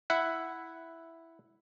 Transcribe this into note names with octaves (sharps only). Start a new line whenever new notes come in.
E4 E5 F#5